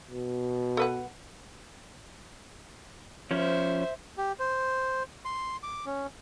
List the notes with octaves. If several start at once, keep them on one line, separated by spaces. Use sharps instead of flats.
B2
A4 B4 F#5
F3 C#4 C5 E5
G4
C5
C6
D6
C#4